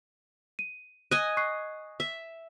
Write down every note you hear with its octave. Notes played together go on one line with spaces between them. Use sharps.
D#7
D#5 G#5 D#6 F#6
C#6 F#6 C7
E5